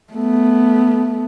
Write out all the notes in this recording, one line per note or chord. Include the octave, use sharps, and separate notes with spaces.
A3 B3